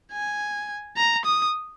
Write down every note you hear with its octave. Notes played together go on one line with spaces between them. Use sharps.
G#5
A#5
D#6